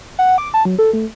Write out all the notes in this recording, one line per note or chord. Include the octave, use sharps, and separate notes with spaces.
F#5
D6
A5
F#3
A4
A3